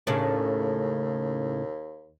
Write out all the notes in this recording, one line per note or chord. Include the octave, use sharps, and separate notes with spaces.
D#2 A2 C#3 D4